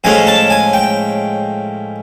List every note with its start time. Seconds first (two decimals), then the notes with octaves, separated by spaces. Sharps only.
0.04 A2 F3 G#3 C#4 G#5
0.27 A5
0.50 G#5
0.73 G5